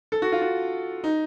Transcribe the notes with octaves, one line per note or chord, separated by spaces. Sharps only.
A4
F#4
F4
F#4
D#4